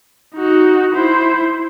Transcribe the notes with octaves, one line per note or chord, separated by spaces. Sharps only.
D#4 F#4
E4 C5